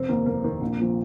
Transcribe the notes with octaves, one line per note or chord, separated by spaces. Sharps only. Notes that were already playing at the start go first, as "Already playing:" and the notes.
Already playing: F1 C4
D#2 D#3 A#3
F1 A#3
D#2 D#3
A#1
A#2 F3